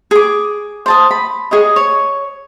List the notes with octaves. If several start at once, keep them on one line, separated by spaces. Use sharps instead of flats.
G#4 D6
C5 A5 D#6
B5
G#4 C#5 D#5
C#5